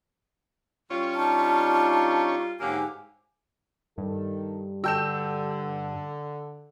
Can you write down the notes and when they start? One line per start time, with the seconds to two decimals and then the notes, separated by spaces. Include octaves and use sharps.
0.90 G3 C#4 F4 C#5
1.15 D4 D#4 A5
2.60 G#2 D3 F#3 A#3 G4 G#5
3.98 G2 D#3 A4
4.84 D3 F#4 G5 A5 E6 G6 E7